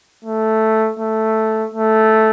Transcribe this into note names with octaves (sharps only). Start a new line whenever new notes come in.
A3
A3
A3